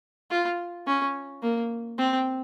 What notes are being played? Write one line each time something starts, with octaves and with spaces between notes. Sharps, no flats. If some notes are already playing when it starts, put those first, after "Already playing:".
F4
C#4
A#3
C4